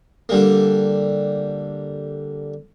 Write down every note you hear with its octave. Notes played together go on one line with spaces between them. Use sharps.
D3 G3 A#3